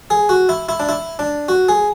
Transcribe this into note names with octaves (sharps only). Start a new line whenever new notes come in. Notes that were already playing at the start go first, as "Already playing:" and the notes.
G#4
F#4
E4
E4
D4
E4
D4
F#4
G#4